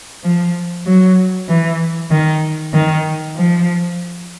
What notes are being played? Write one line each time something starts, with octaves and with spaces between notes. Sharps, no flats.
F3
F#3
E3
D#3
D#3
F3